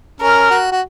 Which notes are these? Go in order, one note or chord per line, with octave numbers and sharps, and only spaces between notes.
C#4 A#4
F#4
F#4